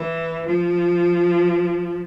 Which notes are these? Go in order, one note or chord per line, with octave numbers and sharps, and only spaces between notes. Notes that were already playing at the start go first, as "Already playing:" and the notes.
Already playing: E3
F3